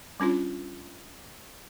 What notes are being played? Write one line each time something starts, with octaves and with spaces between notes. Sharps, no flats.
G3 C#4 D4 F4